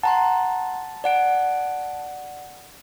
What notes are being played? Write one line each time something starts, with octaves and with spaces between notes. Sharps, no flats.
F#5 A5 A#5 C6
D5 F#5 D7